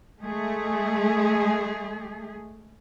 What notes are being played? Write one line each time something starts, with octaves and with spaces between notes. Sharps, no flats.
G#3 A3 G#4